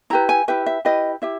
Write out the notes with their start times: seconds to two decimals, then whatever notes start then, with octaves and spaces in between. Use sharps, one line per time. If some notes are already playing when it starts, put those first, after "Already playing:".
0.10 E4 G4 B4 A#5
0.29 G#5
0.48 E4 G4 B4 E5
0.66 E5
0.85 E4 G4 B4 D#5
1.22 E4 G4 E5